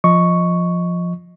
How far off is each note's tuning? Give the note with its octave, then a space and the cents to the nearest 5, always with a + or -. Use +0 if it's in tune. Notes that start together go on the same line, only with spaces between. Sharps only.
F3 +0 D#5 +0 C#6 +0